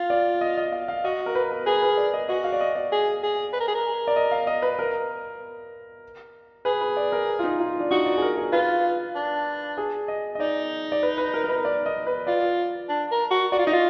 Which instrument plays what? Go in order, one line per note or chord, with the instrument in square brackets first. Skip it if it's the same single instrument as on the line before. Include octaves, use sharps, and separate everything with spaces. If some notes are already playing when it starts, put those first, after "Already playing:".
Already playing: [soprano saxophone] F4 [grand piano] F5
[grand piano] D5
D#5
D#5
F5
F5
[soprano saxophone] F#4 [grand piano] D#5
[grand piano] A#4
B4
A#4
[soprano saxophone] G#4 [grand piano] B4
[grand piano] B4
D5
D#5
[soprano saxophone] F#4 [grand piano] D#5
[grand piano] F5
D5
D#5
D5
[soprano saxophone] G#4
G#4
B4
A#4
G#4
A#4
[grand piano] D5
D#5
F5
D#5
B4
A#4
[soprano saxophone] G#4 [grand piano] B4
[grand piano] B4
D5
A#4
F4
D#4
F4
D4
[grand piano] D#4 [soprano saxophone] F#4
[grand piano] D5
G#4
A#4
G#4
[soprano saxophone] F4 [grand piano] B4
[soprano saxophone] D4
[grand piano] G#4
D#5
D#5
[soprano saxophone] D#4 [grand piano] D5
[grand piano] D5
B4
B4
A#4
A#4
B4
D5
D#5
B4
[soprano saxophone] F4 [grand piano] D5
[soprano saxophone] D4
A#4
F#4
[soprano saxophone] F#4 [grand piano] D5
[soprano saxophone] F4
[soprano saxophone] D#4 [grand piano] D#5
[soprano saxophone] F4